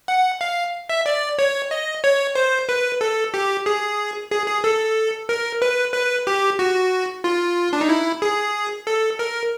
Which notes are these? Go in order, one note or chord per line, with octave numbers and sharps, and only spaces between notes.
F#5
F5
E5
D5
C#5
D#5
C#5
C5
B4
A4
G4
G#4
G#4
G#4
A4
A#4
B4
B4
G4
F#4
F4
D4
D#4
E4
G#4
A4
A#4